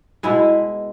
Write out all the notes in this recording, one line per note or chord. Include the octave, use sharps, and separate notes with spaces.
B2 G#3 E4